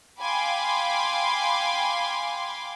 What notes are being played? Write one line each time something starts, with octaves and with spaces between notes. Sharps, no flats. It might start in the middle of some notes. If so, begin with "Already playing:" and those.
F5 G5 G#5 B5 C6 D6